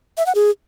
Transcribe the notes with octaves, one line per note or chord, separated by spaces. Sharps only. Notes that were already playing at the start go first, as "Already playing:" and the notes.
E5
F#5
G#4